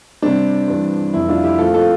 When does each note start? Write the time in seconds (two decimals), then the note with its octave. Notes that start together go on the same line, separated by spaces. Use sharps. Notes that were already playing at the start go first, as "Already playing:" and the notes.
0.22 C3 G3 C4 D4
0.68 G2 E3 G3 C4
1.13 F2 C3 G3 E4
1.29 D4 F4
1.44 E4 G4
1.58 A#2 F3 A3 C4 F4 A4
1.74 F4 A4